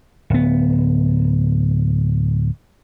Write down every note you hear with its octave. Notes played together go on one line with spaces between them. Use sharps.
D1 B3